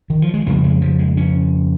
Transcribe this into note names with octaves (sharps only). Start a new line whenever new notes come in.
D#3
F3
G#3
F2 C#3 A#3
G#3
F3
G#3
C#4